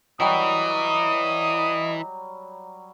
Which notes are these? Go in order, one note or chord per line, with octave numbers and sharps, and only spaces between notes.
E3 F#3 G3 D#5 D#6